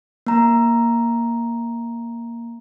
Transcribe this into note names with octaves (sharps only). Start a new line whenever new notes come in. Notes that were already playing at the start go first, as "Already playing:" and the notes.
A#3 A#5